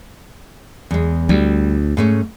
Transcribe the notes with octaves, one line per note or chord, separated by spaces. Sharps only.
E2 G#3
D2 G3
G#2 A3 C#4